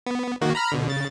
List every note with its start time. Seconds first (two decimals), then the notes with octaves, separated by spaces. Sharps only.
0.06 B3
0.41 D#3 A#3 F#4
0.55 A#5 B5 F6
0.72 B2 D3
0.88 C#3 A6